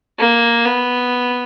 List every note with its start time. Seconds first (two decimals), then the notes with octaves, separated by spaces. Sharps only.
0.19 A#3
0.64 B3